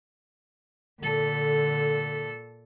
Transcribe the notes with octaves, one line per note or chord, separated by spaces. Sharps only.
A#2 D3 A4